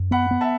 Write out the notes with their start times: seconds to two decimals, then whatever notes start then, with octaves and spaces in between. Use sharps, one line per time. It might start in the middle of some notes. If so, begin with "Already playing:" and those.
Already playing: F#2
0.11 B3 F#5 B5
0.31 B3
0.41 E5 A5